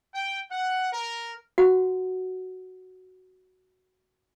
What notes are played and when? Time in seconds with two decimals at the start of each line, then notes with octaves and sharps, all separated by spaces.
0.14 G5
0.51 F#5
0.92 A#4
1.58 F#4 F#5